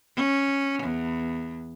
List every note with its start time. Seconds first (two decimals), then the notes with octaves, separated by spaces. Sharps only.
0.16 C#4
0.83 E2